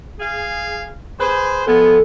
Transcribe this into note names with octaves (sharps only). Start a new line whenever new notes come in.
G#4 F5
G#4 B4 C5
F3 G#3 B3 A4